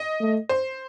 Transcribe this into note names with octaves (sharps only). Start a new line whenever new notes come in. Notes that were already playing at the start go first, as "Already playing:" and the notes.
Already playing: D#5
A3
C5